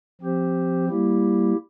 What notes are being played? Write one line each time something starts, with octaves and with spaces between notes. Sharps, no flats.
F3 C4 G4 C5
G3 A#3 E4 G4